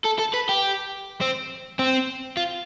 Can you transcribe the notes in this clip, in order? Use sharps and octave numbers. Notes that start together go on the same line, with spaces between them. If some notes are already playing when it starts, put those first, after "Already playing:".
A4
A4
B4
G4
C4
C4
F4